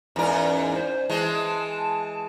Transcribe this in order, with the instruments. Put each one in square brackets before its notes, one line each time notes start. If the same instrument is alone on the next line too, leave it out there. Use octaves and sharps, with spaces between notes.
[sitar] E2 G#2 A#4 [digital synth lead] C#4
[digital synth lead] C5
[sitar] E3 G#3 [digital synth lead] A5